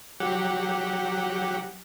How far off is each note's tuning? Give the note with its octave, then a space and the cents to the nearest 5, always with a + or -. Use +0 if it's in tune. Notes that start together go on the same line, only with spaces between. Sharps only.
F#3 +0 G4 +0 F#5 -10